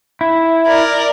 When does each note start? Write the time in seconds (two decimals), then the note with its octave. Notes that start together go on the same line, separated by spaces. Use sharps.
0.21 E4
0.67 A#4 D5